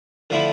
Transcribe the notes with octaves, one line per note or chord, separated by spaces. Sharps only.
D3 F3 A3 E4